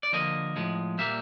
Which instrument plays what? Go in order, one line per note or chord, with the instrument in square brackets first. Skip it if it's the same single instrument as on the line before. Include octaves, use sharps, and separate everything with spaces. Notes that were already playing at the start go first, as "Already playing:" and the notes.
[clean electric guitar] D5
D3 F3 A#3 D#5
A2 F3 G#3
A#2 G3 A#3 E5